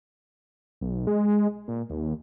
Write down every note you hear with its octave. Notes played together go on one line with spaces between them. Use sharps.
B1
G#3
A#2
D#2